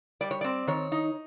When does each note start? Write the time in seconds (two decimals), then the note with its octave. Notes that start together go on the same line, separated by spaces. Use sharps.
0.21 G3 D5
0.31 C#5
0.41 C4 D5
0.67 D#3 C#5
0.92 D#4